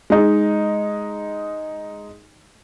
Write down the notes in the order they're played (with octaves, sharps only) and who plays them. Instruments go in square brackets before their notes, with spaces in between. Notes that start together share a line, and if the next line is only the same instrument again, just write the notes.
[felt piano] G#3 D#4